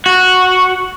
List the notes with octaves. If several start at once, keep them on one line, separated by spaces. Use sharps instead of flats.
F#4